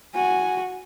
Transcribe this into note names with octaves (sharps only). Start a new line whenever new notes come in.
F#4 G#5